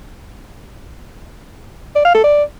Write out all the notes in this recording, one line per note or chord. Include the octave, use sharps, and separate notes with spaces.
D5
F5
A4
D5